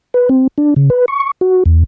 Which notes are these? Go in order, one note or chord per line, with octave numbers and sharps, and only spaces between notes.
B4
C4
D4
C#3
B4
C#6
F#4
E2